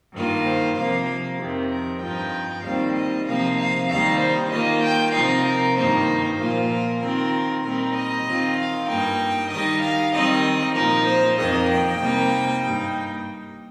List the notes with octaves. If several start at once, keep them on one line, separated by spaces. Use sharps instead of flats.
G2 D#3 A#3 F4
C5
C3 F3 A#3 F5
F2 C3 D#3
A#4
G2 F3 D#4 G5
D#2 D#3 G3 C4 F5
D#5
C3 F3 A#3 D#4 F5
F5
D#2 D#3 G3 D#4 F5
C5
D#3 A#3 F4 D#5
G5
C3 F3 D#4 F5
A#4
G2 D#3 A#3 D#4 C5
A#2 F3 A#3 F4
A#4
D#3 C4 F4 A#4
A#2 G3 C4 D#4 A#4
D#5
D#3 C4 F4
F5
G2 G3 A#3 D#4 G5
D#3 G3 D#4 D#5
F5
D#3 G3 C4 D#4 D#5
A#2 F3 D#4 A#4
C5
F2 D#3 A#3 D#5
G5
C3 G3 A#3 D#4
G2 G3 A#3 D#4